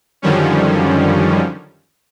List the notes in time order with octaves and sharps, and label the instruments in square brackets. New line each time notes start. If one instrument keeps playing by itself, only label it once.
[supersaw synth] F#2 D3 D#3 F3 G3 C#4